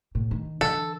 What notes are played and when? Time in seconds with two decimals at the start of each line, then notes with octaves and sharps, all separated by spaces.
0.15 A2
0.31 D#3
0.61 D3 E3 A4